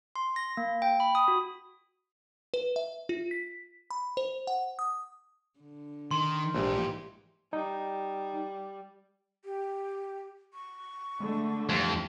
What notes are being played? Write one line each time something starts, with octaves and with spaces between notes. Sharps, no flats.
C6
A#6
A#3
G5
B5
D#6
F#4
B4
E5
F4
B6
B5
C5
F#5
D#6
D3
D#3 C6
A#1 G#2 E3 G4
G3 D#4
G4
C#6
D3 G#3 A3
F2 E3 G3 C5